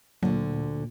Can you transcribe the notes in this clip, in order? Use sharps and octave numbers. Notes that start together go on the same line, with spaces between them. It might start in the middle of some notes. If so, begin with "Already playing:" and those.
D2 A#2 D3 F#3